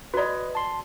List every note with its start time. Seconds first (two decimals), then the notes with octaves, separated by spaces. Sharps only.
0.14 F#4 B4 D5 D#5
0.55 A5 C6